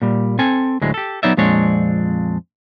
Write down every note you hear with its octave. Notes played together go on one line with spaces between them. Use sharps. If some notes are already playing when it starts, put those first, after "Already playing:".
A#2 G3
C4 A4 G#5
D2 A2 F#3 G#3
G4 A4
F#3 B3 D#4 C#5 D5 E5
F2 A#2 G#3 C4 D4 C#5